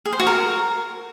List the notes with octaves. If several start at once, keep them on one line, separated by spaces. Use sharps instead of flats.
G#4
C5
F#4
A#4